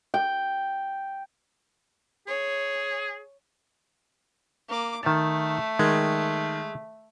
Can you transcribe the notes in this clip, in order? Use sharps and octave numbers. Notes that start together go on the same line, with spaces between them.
G5
G#4 C#5
A#3 D6
D#3 A3 A5
D#3 G#3